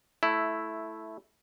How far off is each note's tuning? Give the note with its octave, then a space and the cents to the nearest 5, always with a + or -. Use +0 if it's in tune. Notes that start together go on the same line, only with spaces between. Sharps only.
A3 -10 E4 +0